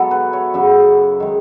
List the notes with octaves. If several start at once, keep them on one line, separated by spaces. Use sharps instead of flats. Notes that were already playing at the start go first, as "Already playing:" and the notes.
Already playing: B2 F#3 B3 E4 F#4 A4
B4
C#5
F#2 C#3 F#3 E5
D#3 G#3